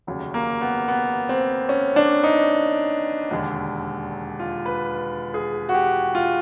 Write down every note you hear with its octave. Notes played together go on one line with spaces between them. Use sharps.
F1 D#2 C#3 F#3
A#3
B3
B3
C4
C#4
D4
D#4
E1 D#2 D3
F4
B4
G#4
F#4
G4
F4